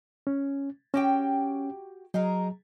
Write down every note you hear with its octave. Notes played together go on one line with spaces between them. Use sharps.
C#4
C#4 F#4 G4 G5
F#3 D#4 G#4 A#4